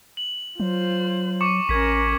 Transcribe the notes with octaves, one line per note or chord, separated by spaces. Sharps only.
F#7
F#3 F4 C5
C#6 D6 C#7
A1 C#4 A#4 G#6 B6